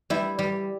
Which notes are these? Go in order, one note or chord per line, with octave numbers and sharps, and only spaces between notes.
G3 E4
G3